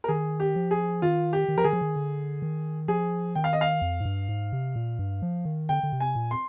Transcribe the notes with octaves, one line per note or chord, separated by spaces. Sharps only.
A#4
D#3 G#4
G4
F3
G#4
D#3 F4
G4
D#3
F3 A#4
D#3 G#4
F3
D#3
D3
D#3
F3 G#4
D#3 G5
F5
D#5
F5
F2
G#2
G2
G#2
C3
A#2
G2
F3
D#3
D3 G5
D3
C3
G#5
A#2
C6